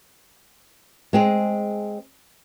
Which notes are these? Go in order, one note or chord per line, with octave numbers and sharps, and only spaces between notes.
G#3 C4 G#4